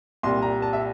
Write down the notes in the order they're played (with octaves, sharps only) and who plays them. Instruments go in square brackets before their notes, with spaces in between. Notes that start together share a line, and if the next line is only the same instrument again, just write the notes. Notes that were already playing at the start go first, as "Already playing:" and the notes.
[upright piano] C2 A#2 G3 C6
A#5
A5
E5